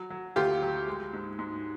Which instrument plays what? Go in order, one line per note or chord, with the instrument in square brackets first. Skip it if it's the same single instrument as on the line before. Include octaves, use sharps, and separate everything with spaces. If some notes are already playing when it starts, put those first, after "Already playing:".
Already playing: [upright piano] F#3
F#3
D2 F4 G4
F#3
G#3
G#2
G#2